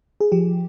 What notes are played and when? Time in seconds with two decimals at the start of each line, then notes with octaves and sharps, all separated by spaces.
0.20 G#4
0.32 F3 G4